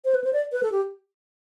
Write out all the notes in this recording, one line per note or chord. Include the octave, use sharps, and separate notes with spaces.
C5
B4
C5
D5
B4
A4
G4